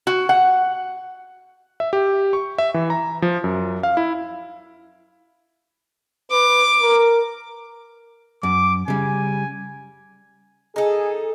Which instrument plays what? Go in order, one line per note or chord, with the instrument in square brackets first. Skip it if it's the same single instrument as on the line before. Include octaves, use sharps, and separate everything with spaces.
[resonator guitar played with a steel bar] F#4
F#5
[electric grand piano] E5
G4
C#6
E5
E3
A#5
F3
F#2
F5
E4
[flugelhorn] B4 [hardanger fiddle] D6
[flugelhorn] A#4
[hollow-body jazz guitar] F#2 [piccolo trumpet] D6
[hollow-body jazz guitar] C#3 G3 [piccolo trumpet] G#5
[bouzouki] D#4 A4 [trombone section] G#4